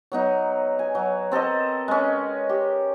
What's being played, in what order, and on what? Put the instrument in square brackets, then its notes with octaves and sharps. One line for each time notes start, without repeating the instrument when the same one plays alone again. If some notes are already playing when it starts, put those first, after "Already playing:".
[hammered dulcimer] F#3 B3 D#4
G#5
F#3
C4 A4 A#4 D#5
G#3 C#4
G4